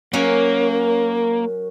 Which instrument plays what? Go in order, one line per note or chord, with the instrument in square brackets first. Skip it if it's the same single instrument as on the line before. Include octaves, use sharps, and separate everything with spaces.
[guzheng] F#3 C#4 [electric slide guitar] A#3 [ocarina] A#4